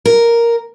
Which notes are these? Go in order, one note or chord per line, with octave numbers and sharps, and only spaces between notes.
A#4